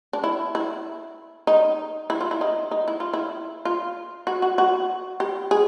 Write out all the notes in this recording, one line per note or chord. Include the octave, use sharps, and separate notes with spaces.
D4
E4
E4
D#4
E4
F4
E4
D#4
D#4
E4
F4
E4
F4
F#4
F#4
F#4
G4
G#4